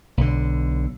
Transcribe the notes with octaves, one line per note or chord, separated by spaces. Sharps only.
B1 D3